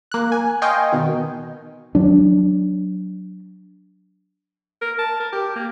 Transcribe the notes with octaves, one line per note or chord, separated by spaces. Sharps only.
A#3 F#6
G#5
D#5 F5 G5 G#5 C6 C#6
B2 D#3
F#3 D4
A#4
A5
A#4
G4
A#3